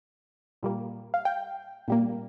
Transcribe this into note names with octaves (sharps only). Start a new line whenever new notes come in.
A#2 G3 A#3
F5
G5
A#2 G3 A#3